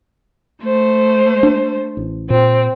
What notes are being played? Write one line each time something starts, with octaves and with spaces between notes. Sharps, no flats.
A3 C5
D4
A1
A#2 C4